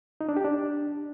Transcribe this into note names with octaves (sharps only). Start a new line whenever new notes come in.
D#4
D4
G4
D4